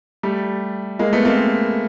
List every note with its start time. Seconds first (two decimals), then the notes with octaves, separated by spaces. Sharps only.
0.23 G3 A3
0.99 G#3 A#3
1.13 A3 B3
1.25 A#3 C4